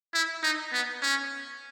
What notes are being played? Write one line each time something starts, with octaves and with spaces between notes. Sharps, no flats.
E4
D#4
B3
C#4